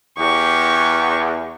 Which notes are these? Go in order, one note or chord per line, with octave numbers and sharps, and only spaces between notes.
E2 G4 C#6